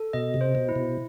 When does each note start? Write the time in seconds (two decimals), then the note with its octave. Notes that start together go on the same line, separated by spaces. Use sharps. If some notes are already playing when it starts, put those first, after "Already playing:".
Already playing: A4
0.13 B2 D#5
0.34 C3
0.41 C5
0.55 B2
0.69 E4
0.76 B2